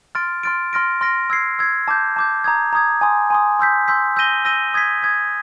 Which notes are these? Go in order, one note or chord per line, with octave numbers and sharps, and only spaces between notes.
C6 F6 A6 D7
C6 F6 A6 D7
C6 F6 A#6 D7
C6 F6 A#6 D7
E6 G#6 C7
E6 G#6 C7
A5 D6 G6
A5 D6 G6
A#5 D#6 G#6
A#5 D#6 G#6
G#5 C6 D#6
G#5 C6 D#6
C6 E6 G6 B6
C6 E6 G6 B6
E6 G6 A#6 D#7 G7
E6 G6 A#6 D#7 G7
D#6 G#6 B6
D#6 G#6 B6